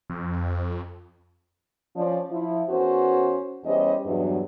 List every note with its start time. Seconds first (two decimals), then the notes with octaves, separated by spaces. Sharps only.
0.10 F2
1.96 F3 C#4 D5
2.30 F3 E4
2.69 E2 C#4 F#4 A#4 C5
3.64 E2 G3 C#4 C5 D#5
4.05 E2 G2 F#3